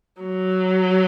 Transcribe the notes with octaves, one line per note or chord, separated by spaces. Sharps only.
F#3